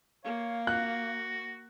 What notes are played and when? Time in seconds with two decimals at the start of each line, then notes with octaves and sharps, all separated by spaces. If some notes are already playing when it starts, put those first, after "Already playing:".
0.24 A#3 C#5 F5
0.67 F#4 F#6